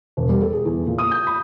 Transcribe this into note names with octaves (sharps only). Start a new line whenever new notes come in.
E1
G3
A4
G#4
E2
A#2
D#6
G6
B5